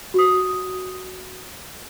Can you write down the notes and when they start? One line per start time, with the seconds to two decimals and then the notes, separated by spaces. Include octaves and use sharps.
0.14 F#4 D#6